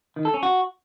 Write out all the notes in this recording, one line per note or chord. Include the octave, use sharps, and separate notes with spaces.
D#3
A4
C#4
F#4